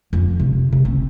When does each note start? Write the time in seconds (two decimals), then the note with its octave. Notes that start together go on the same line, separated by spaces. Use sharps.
0.13 F2
0.40 C3
0.73 C3
0.85 C4